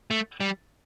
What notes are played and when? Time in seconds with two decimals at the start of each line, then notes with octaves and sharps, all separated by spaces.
0.11 A3
0.40 G3